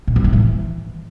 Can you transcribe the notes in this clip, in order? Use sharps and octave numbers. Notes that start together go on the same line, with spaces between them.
A#2
G2
A2
E3